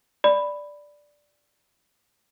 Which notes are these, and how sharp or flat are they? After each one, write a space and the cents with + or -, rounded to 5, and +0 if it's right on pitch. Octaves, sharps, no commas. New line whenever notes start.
D5 +0 B5 +5